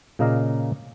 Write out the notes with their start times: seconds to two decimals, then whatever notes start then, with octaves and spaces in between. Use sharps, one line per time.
0.19 A#2 C#3 A#3 D#5 F5 A#5